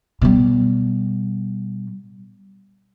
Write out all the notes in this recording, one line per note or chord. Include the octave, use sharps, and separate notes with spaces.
B2 G3